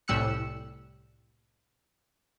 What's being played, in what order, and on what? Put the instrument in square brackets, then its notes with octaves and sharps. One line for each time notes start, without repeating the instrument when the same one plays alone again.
[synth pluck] C2 A2 G3 E6 F#6 C#7